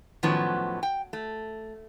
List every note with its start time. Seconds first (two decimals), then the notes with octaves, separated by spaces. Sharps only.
0.23 A2 D#3 F3 F#3 B3 C#4
0.83 G5
1.13 A3